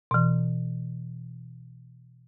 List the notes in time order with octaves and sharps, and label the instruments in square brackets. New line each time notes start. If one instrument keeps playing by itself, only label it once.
[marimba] B2 E3